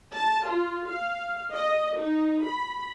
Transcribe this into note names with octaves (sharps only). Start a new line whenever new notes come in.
A5
F4
F5
D#5
D#4
B5